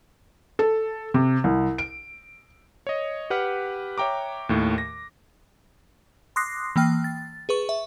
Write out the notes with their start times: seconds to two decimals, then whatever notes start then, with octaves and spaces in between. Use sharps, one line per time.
0.59 A4
1.14 C3
1.44 C2
1.78 D7
2.87 C#5 D#5
3.30 G4 B4 F#5 F6 F#6
3.98 C#5 E5 G5 A#5 D6
4.49 D#2 A2 D#3 A3
4.78 A#6
6.36 C6 D6 D#6 F#6 A#6 C7
6.76 E3 A#3 G5 F6
7.04 A6
7.49 G#4 B4 C#6
7.69 E5